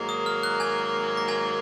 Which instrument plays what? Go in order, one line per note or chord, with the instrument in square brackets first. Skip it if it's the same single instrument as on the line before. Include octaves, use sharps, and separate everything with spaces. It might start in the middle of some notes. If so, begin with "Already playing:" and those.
Already playing: [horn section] G#2 D#3 F#3 A#3
[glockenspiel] D#6
F6
F#6
G#5 G#6
A#6
G#5 G#6